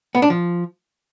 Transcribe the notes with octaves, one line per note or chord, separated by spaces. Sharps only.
B3
D4
F3